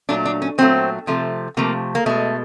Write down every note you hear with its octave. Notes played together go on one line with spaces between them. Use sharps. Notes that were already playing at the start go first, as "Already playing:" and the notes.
A#2 F#3 A3 D4
D4
C#4
A#2 F#3 A3 C4
C3 F3 A3
C3 F3 A3 A#3
A#3
B2 G#3 A3